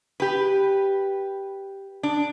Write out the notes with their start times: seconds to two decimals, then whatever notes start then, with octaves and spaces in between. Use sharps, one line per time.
0.20 G4 B4
2.03 D4